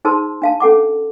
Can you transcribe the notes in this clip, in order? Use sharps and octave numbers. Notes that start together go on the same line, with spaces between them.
D#4 G#4 C5 A5 C6 E6
D4 F5 A5
C#4 A4 F#5 D6